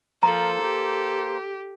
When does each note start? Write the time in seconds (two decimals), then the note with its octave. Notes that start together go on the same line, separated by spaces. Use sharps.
0.23 F3 A#3 A4 C5 A#5
0.62 G4